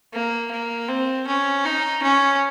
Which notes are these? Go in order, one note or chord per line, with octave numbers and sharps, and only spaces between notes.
A#3
A#3
C4
C#4
D#4
C#4